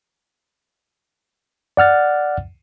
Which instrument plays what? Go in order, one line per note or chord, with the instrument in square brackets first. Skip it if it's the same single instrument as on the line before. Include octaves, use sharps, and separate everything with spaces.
[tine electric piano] D5 F#5 F6 A6